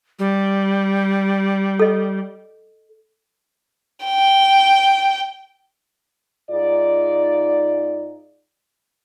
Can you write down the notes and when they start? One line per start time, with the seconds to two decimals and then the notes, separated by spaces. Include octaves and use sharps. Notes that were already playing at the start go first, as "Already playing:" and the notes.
0.19 G3
1.79 A4 D#5
4.05 G5
6.50 G#2 D#4 F4 D5